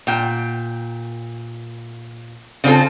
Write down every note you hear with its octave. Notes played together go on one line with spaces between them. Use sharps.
A#2 G5
C#3 C4 D4 F4 A4